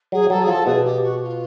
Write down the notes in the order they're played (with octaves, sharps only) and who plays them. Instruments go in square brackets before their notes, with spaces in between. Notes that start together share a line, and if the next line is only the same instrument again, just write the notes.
[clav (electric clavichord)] F#3 [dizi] G#4
[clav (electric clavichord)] F#3 [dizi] A4
[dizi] G#4
[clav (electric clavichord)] F3 [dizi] A4
[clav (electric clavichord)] B2 [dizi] G#4
[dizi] G4
F#4
F4